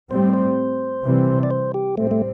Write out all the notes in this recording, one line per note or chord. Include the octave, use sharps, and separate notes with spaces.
A2 G3 C4 C5
C5
C3 E3 G3 C4
D5
C5
G4
A2 G3 A3 C4
A3